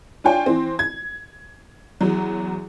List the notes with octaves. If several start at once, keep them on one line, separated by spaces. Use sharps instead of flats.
D4 F4 C#5 G5 G#5
E3 C4
G#6
E2 F#3